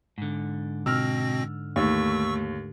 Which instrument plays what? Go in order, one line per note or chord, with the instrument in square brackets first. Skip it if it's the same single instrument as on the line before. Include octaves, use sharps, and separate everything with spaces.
[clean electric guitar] G#2 D3
[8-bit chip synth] B2 C4 A#6 [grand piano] E6 F6
[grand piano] D#2 [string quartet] A3 [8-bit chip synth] C#6 E6